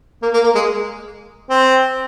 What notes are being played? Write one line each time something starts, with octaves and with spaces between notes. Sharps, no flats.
A#3
A#3
A#3
G#3
C4